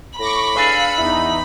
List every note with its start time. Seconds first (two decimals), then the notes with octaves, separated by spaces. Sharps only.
0.19 A2 B5 C#6 D6 A#6
0.55 D4 G#4 B4 F5 E6 C#7
0.98 E2 D#4 E4